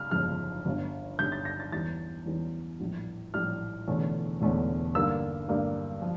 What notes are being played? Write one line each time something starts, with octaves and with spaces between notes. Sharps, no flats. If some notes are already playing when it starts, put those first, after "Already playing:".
Already playing: C#3 F6
G1 F2 C#3 F6
G1 G2 D3 G3 C#4
G1 G2 D3 G3 C#4 G6
A6
A#6
A6
E2 E3 G3 C#4 A6
E2 E3 G3 C#4
A#1 A2 G3
A#1 A2 G3 F6
E1 E2 D3 A3 C#4
E1 E2 D3 A3 C#4
G2 D3 G3 A#3 E6
G2 D3 G3 A#3
F3